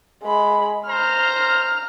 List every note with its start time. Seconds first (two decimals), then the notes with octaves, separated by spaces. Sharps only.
0.23 G#3 B5
0.88 C5 A#5 F6